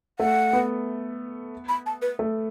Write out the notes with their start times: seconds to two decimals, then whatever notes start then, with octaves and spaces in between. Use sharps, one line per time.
0.19 A3 F#5
0.53 B3
1.68 B5
1.86 A5
2.02 B4
2.19 A3